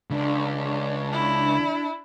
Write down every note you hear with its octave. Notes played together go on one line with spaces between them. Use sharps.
C#2 D4
E4